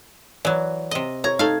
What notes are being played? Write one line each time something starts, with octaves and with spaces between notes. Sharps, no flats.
E3 F#3 D5
C3 D#5
C#5 A#5 C#6 G#6
A3 D#4 F5